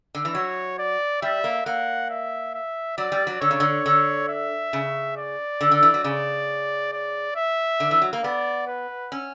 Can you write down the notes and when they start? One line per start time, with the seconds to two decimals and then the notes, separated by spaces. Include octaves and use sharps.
0.15 D3
0.25 E3
0.35 F#3 C#5
0.79 D5
1.22 G3 E5
1.44 A#3
1.66 A#3 F#5
2.10 E5
2.54 E5
2.98 F#3 D5
3.12 G3
3.27 F#3
3.41 D3 C#5
3.51 C#3
3.60 D3
3.86 D3
4.29 E5
4.73 C#3
5.17 D5
5.61 D3
5.71 D3
5.83 E3
5.94 F#3
6.04 C#3 D5
6.93 D5
7.36 E5
7.80 D3
7.91 E3
8.02 F#3
8.13 A#3
8.24 B3 D5
8.68 B4
9.12 C#4